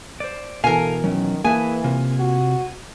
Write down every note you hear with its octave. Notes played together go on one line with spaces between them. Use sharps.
C5 D5
B2 E3 A4 A#4 F5 G#5
D#3 F#3 C#4
E3 A#3 G#4 B4 E5 G#5
C3 F4
F#4